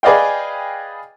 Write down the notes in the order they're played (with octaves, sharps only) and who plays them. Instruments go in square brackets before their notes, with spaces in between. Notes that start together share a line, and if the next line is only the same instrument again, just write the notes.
[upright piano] G#4 B4 D5 D#5 F5 G5